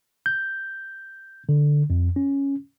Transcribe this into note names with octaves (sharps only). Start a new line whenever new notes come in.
G6
D3
F2
C#4